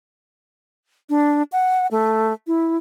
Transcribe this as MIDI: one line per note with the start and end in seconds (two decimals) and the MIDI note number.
1.09 1.43 62
1.52 1.87 78
1.91 2.33 57
2.47 2.77 64